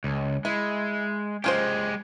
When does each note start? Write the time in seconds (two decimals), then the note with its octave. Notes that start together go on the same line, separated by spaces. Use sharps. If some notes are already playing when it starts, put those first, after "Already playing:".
0.04 C#2
0.45 G#3 E4
1.44 G#3 C#4 F4 G4 C5